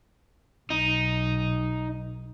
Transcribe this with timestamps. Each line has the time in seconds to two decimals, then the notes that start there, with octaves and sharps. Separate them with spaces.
0.70 B1 D#4